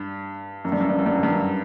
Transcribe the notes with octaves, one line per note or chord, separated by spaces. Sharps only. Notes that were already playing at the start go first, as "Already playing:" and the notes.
Already playing: G2
F#2
G2
F#2
G2
F#2
G2
F#2
G2
F#2